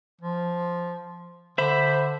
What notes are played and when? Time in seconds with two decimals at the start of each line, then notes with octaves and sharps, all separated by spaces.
0.22 F3
1.58 D3 C5 E5 B5